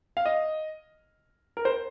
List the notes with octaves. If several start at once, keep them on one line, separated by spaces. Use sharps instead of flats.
F5
D#5
A#4
C5